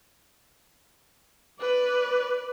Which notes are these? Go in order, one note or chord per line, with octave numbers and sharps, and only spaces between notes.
B4 D5